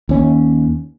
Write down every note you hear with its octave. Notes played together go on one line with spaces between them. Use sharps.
D#2 C#4